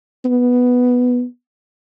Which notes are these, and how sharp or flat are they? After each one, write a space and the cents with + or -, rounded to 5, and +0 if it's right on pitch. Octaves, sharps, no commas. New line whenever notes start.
B3 +0